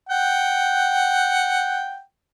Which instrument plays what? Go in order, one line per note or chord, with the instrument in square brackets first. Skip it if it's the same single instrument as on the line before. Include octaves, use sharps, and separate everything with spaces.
[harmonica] F#5 G5